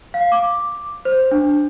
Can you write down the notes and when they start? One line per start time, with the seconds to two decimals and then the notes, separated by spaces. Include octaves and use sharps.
0.14 F5
0.32 D6
1.05 C5
1.32 D4